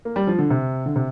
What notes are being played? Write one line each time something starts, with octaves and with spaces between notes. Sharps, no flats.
A#3
G3
F3
D3
C3
D3
C3